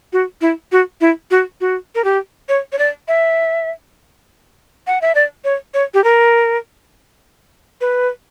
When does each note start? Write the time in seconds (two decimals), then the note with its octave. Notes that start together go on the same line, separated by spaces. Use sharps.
0.13 F#4
0.41 E4
0.72 F#4
1.01 E4
1.31 F#4
1.61 F#4
1.95 A#4
2.04 G4
2.49 C#5
2.72 C#5
2.79 D5
3.08 E5
4.87 F#5
5.01 E5
5.15 D5
5.44 C#5
5.74 C#5
5.94 G4
6.04 A#4
7.81 B4